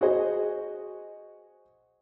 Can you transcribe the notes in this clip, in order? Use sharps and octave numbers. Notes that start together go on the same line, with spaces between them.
F#4 G#4 C5 D#5